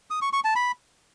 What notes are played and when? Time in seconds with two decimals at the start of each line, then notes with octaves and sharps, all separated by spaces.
0.10 D#6
0.22 C#6
0.33 C#6
0.44 A5
0.56 B5